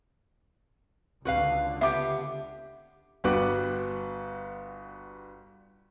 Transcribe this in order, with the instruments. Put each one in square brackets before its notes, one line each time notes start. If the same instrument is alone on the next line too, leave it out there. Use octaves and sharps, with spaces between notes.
[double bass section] C#2 D3 [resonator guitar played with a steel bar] F#4 B4 F5
[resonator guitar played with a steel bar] B3 G4 [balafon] E5 D6
[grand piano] G1 G3 B3 F#4 D6 F#6